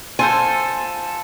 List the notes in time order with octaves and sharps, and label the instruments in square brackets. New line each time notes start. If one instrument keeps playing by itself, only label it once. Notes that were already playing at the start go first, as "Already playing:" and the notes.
[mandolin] F4 A4 C5 [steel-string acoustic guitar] G#5